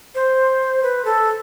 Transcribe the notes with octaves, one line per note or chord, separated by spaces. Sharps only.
C5
B4
A4